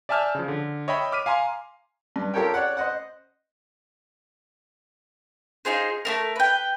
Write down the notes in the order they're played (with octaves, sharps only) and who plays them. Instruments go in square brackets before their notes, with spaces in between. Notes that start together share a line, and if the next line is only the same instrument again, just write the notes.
[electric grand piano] D5 E5 G#5 A5 F6 G6
C#3 F3
D3
C#5 D#5 E5 G5 B5
D6 F6 B6 D#7
F5 G#5 A#5 C6
[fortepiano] G2
F4 G4 A4 A#4 C#5 G5
C#5 D5 F#5
C5 D#5 F#5
[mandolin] D#4 F4 G#4 C5
A3 C4 A#4
B4 G5